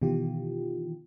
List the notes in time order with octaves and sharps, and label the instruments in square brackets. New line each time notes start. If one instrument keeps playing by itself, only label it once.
[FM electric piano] B2 D#3 E3 F4 G4